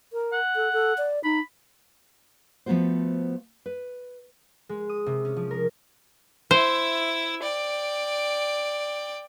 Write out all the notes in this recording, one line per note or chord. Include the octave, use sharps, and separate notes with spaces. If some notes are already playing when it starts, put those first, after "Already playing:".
A#4
F#5
A4
A4
D5
D#4 B5
F3 A3 B3 F4 F#4 C5
B4
G#3
D#6
C3
C#4
F3
A#4
E4 C5 E5
D5 G5